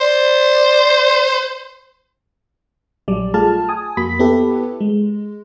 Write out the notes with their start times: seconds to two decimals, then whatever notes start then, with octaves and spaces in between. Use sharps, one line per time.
0.01 C5 D5
3.08 A#1 F#3 G3 D5
3.34 A3 F4 G#4 A5 F6
3.69 G#5 D#6
3.97 F2 A#3 F#4 B5 B6
4.19 B3 E4 G4 A4 B4
4.81 G#3